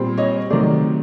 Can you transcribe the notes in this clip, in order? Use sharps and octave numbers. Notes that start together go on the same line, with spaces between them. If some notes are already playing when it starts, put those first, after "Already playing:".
Already playing: A#2 G3 C4
C#5 D#5
C3 D#3 F#3 A3 C5 D5